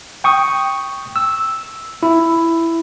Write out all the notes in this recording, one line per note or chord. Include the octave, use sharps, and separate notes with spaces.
G5 C#6 D#6
E6
E4